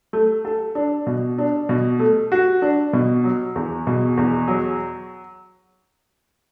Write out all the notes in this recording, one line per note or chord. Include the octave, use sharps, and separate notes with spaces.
A3
A4
D4
B2
D4
B2
A3
F#4
D4
B2
F#3
E2
B2
E2
F#3